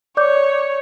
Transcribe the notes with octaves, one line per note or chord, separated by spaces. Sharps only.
C#5 D5 D6 G6